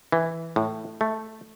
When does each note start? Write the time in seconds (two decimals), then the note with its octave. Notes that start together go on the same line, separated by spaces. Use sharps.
0.12 E3
0.56 A2
1.01 A3